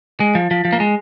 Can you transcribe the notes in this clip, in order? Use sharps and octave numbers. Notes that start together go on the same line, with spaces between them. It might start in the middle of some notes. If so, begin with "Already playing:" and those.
G#3
F3
F3
F3
A#3
G#3